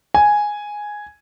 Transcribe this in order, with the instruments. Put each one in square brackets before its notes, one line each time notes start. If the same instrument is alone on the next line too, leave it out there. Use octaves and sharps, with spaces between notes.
[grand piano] G#5